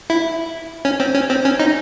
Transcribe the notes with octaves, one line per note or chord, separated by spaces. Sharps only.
E4
C#4
C4
C#4
C4
C#4
D#4